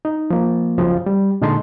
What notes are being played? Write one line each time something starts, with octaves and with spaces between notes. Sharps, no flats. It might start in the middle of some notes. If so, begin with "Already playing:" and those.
D#4
F3 A#3
C#2 F#2 C#3 F3 F#3
G3
A#2 D3 G#3 D#4 A5 C6